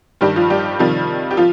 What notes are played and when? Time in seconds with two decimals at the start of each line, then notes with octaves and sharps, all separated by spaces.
0.21 G2 D#3 G3 G4
0.36 F3 F4
0.50 G3 G4
0.79 C3 D#3 F3 G3 F4
1.31 G4
1.37 F3 F4